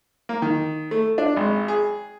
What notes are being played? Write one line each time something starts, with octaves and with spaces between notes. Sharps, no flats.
A#3
D#3
A3
D4
G#1
G#4